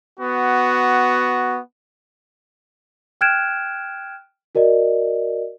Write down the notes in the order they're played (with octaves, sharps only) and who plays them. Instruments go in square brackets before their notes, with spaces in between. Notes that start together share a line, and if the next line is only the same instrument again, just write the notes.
[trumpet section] B3 F#4
[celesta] G5 F6 F#6 G#6 D7 E7
F#4 A#4 D5 D#5